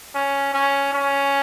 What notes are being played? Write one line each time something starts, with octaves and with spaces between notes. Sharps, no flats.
C#4
C#4
C#4